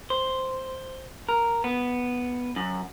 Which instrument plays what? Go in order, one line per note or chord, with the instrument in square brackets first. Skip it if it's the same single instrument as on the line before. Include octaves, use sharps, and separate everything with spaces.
[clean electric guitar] C5
A#4
B3
F#2